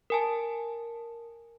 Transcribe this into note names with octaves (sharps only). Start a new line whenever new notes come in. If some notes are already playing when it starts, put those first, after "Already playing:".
A#4 G#5 A5